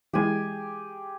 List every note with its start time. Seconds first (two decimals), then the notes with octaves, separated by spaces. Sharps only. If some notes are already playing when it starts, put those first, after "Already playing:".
0.13 E3 G#3 E4 G4 G#4 G#5